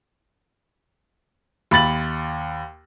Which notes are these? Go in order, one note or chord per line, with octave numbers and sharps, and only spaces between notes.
D#2 B5 A6 F#7